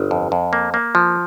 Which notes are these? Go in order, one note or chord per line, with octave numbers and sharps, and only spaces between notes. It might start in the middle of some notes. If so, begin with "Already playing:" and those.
Already playing: G1
F2
F2
A#3
A#3
F3